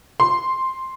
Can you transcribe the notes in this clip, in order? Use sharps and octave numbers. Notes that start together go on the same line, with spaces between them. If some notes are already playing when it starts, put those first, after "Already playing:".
C6